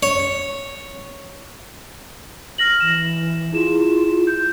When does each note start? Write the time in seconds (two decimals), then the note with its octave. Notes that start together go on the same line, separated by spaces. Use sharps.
0.03 C#5
2.58 F6 A#6 F#7
2.80 E3 E7
3.53 E4 F4 G#4 E7
4.27 G6